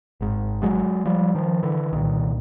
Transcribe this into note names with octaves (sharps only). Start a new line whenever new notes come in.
G#1 G#2
F#3 G#3
F3 G3
D#3 F3
D3 E3
C2 A#2 D#3